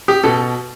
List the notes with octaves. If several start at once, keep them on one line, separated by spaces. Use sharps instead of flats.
G4
B2 A4